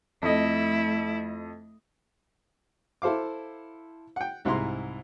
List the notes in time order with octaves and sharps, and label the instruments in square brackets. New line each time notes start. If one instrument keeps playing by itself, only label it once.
[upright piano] F2 D#5 [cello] A3 E4
[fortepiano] E4 A4 C5 F5 D6
F#5 G5
C2 G#2 E4 G#4 A#5 C6